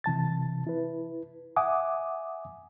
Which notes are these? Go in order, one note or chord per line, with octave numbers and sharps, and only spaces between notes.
C3 E3 A5 A6
E4 B4
E5 F#5 G#5 D6 D#6